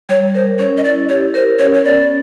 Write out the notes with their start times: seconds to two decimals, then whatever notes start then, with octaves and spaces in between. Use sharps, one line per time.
0.09 G3 C#5
0.35 A#4 C5
0.59 C#4 C#5
0.77 D#5
0.84 E4 D5
1.09 G4 C#5
1.34 A#4 C5
1.59 C#4 C#5
1.74 C#5
1.85 B3 D5